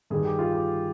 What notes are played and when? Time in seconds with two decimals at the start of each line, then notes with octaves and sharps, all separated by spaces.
0.10 G2 D#3 G#4
0.25 G4
0.39 F4
0.53 G4